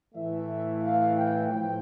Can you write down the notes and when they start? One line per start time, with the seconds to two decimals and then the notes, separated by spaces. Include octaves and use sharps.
0.15 A2 E3 A3 E5
0.82 F5
1.17 G5
1.49 A2 F3 G5